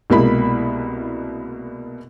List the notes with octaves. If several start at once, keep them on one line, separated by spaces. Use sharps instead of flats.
C2 B2 G#3 A#3 E4 B5